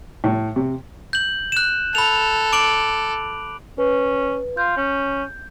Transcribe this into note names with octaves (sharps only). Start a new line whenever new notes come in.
A2
C3
G6 F#7
F#6 E7
A4 B5 F7
D6 D7 F#7
C#4 B4
F4 G6
C#4